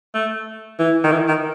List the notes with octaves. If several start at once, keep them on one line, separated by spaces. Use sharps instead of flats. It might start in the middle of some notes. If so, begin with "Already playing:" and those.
A3
E3
D#3
E3
D#3